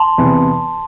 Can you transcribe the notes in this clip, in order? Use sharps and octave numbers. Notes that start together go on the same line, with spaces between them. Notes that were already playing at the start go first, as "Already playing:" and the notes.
Already playing: A5 C6
E2 C3 E3 B3